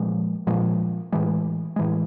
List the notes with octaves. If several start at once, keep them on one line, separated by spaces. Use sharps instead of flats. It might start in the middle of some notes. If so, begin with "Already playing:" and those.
Already playing: A#2 F3 G#3
A#2 F3 G#3
A2 E3 G#3
A2 E3 G#3